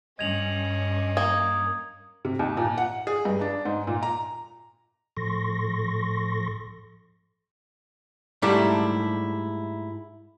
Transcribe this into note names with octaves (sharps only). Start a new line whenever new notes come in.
G2 C#4 D#5 G#6 F7 F#7
A#3 D#6 G#6
C3
D#2
A#2
F#5
G#4
G2
D4
G#2
A#2
A#5
A2 F3 A4 C6 C#6 A#6
G#2 G3 A3 D4 E4